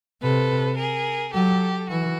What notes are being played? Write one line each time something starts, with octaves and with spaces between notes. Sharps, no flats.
C3 A4 B4
G#4 A#4
F#3 G4 A4
E3 F#4